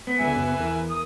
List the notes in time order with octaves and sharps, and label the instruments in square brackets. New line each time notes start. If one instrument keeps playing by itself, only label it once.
[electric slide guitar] B3
[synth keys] C#2 D3 [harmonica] B4 E5 G#5
[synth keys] F#2 C#3
[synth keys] E2 A#4 [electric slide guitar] E3
[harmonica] D#6